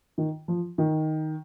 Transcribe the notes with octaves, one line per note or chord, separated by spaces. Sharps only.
D#3
F3
D#3